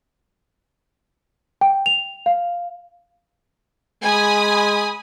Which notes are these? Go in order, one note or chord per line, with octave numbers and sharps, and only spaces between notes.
G5
F7
F5
G#3 G#5 B5 D#6